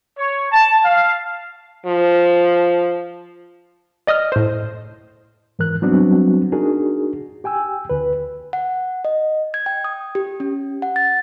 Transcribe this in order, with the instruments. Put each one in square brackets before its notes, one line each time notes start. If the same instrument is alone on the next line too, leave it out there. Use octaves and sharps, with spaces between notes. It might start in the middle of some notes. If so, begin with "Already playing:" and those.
[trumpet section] C#5
A5
F5
[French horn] F3
[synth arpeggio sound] D5 D#5 D#6 F6
A2 C5
[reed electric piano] G#2 E3 A#4 F#6
F#3 G3 B3 C4 D4 F#4
D4 D#4 F#4 G#4 A#4
G4 G5 G#5 E6
D2 B4
[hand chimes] F#5
D#5
G#6
G5
D#6
G4
C#4
F#5
A6